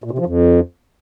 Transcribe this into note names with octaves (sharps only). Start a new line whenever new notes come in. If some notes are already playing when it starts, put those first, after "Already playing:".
A#2
C3
F3
F2